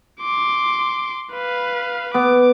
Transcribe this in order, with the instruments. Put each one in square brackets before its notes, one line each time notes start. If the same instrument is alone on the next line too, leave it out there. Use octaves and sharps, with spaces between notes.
[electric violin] C6 D6
B4 F5
[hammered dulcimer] B3 [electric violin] D6